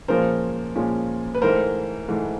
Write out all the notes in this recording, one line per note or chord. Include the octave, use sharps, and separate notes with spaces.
A#2 F3 G#3 C#4 F4 A#4 C5
A#2 F3 G#3 C#4 F4
B4
G#2 E3 A3 A#4 C5
G#2 E3 A3